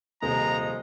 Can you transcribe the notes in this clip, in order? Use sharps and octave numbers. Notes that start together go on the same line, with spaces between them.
D#1 C3 F3 G#3 A#3 D#4 A#5